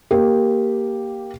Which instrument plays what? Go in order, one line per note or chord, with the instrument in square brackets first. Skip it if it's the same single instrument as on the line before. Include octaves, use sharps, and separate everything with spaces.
[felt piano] A#3 G4